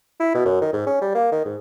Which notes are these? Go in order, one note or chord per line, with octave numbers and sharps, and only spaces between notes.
E4
B2
F#2
D#3
G#2
C#4
G3
A#3
D#3
G#2